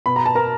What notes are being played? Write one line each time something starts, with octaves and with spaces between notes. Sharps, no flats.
B2 B5
A#5
A5
A#4 A#5